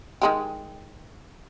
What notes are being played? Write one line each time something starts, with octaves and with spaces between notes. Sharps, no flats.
D#3 G#3 G4